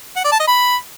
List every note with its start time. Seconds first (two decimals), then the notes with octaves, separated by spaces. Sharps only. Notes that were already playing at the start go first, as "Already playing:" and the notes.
0.16 F#5
0.24 D5
0.32 A5
0.40 D#5
0.48 B5